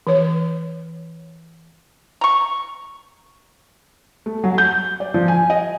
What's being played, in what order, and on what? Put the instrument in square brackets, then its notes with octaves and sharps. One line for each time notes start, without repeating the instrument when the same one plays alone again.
[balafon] E3 C#5
[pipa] A#5 C#6
[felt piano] A3
F#3
G6
D5
F3
G#5
D#5